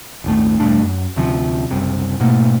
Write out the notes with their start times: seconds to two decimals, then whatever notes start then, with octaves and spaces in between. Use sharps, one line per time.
0.24 D#1 G#1 A3
0.59 E1 G2 A3 D4
0.82 F#2
1.16 D2 C3 F3
1.71 F#1 C2 C3
2.20 G#2 B2 A3 A#3